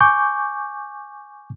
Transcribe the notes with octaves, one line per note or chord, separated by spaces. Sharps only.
G#5 C#6 D6 G6